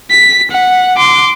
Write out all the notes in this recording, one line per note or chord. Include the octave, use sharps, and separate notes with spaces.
B6
F#5
C6 D6